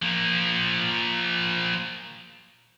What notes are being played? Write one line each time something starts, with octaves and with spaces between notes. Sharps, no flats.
F3 A#3